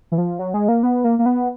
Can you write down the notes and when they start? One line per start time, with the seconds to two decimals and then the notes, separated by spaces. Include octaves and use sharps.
0.12 E3
0.18 F3
0.39 F#3
0.54 G#3
0.68 A#3
0.83 B3
1.04 A#3
1.19 A#3
1.26 B3